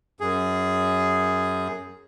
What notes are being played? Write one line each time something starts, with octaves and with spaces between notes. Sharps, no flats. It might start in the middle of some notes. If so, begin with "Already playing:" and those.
F#2 G#4